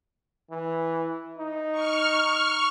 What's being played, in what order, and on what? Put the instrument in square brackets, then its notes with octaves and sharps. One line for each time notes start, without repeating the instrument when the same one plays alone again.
[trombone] E3
D#4
[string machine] C#6 F6